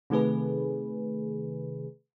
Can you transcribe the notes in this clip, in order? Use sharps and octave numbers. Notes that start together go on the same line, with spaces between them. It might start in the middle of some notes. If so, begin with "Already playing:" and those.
C3 D#3 A3 G#4 B4